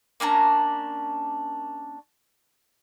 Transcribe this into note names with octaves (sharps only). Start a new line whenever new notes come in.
A#3 C#4 D4 A#5